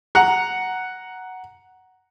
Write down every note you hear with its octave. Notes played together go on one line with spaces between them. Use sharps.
F#5 A#5